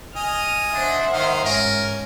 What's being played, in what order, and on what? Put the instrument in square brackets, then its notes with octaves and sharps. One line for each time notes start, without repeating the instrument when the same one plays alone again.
[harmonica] D#5 G#5 [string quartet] F6
[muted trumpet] D4 [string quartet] C5 E5 F#5
[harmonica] D#3 D#5 [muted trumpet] F5
[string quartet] G#2 [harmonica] C#4 [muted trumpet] A#4